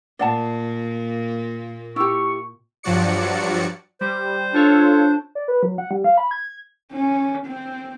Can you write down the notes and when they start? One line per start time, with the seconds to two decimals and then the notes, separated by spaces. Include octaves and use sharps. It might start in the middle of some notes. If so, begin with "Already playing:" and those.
0.19 A#2 A#3 D5 F#5 A5
1.96 E4 G4 C#6
2.83 G2 F3 F#3 F#4 D5 C#7
4.01 G3 C5
4.54 D4 F4 A4 C#5
5.35 D5
5.48 B4
5.63 F#3
5.78 F#5
5.91 G3
6.04 F5
6.18 B5
6.31 G#6
6.93 C#4
7.46 C4